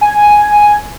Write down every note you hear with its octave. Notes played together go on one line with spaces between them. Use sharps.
G#5